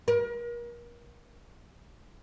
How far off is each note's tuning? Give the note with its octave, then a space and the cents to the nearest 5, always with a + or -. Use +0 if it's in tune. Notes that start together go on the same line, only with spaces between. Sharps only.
A#4 +35